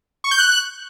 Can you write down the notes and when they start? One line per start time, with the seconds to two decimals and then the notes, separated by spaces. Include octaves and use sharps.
0.24 C#6
0.31 G6
0.38 F#6